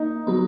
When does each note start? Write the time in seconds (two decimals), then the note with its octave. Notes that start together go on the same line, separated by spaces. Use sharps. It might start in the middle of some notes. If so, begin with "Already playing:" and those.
Already playing: A#3 D#4
0.27 F#3 B3